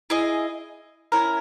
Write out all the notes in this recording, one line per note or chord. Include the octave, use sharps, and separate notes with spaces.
E4 G#4 D#5
C#4 E4 A#4